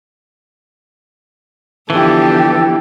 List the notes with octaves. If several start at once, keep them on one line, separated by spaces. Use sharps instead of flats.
D3 E3 F3 B3 G4 A4